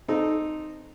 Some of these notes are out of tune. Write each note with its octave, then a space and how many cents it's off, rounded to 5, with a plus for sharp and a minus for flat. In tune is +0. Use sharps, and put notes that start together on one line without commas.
C4 -5 D#4 -10 A4 -15